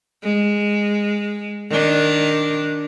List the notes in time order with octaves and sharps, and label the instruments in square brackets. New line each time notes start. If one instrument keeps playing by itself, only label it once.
[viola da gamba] G#3
D#3 D4